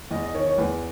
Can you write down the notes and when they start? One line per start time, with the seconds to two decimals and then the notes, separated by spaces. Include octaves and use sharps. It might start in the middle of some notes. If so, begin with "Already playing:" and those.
0.11 E2 D#5
0.23 D#5
0.34 D#3 C#5
0.46 C#5
0.58 E2 B4